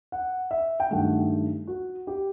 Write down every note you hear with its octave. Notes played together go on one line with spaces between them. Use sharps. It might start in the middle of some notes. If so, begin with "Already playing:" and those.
F#5
E5
G5
G2 D#3 F#3 A3 F#5
F#4
G4